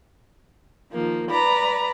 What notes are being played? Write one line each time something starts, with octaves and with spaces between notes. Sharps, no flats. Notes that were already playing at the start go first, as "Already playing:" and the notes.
D#3 F3 A#3
B4 D5 A#5 B5